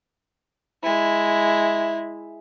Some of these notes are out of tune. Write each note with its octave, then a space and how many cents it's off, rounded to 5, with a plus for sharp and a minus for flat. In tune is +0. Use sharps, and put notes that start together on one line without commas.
G#3 +0 E4 +0